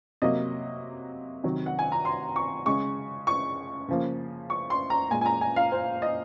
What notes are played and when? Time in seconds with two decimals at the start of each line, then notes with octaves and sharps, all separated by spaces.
0.22 C3 F#3 A#3 D#5
1.44 C3 D#3 F#3
1.66 F#5
1.79 G#5
1.92 A#5
2.05 C6
2.36 C#6
2.66 C#3 G#3 C#6
3.27 C#6
3.88 C#3 F3 A#3
4.50 C#6
4.70 C6
4.90 A#5
5.11 A#2 G#3 G#5
5.21 G#5
5.26 A#5
5.41 G#5
5.56 F5
5.72 C5
6.02 D#5